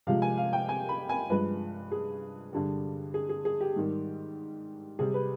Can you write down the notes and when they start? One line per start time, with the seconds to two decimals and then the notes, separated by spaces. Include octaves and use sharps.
0.07 C3 F3 G#3 F5
0.22 G#5
0.38 F5
0.53 G5
0.69 G#5
0.89 B5
1.09 G#5
1.30 G2 F3 G#3 B4
1.92 G#4
2.53 G2 D3 G3
3.14 G#4
3.29 G#4
3.45 G#4
3.61 G4
3.76 G#2 D#3 G3
4.99 C3 G3 G#4
5.14 B4